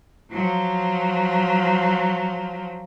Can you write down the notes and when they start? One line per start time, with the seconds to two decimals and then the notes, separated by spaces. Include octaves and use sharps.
0.31 F3 F#3